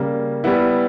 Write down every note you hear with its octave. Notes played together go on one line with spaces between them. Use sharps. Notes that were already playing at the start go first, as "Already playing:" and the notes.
Already playing: C#3 G3 A#3
G3 B3 E4